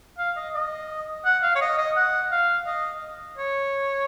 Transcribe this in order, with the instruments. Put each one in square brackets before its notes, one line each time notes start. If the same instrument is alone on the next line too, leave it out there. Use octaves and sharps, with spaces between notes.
[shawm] F5
D#5
D#5
F#5
F5
C#5
D#5
D#5
F#5
F5
D#5
C#5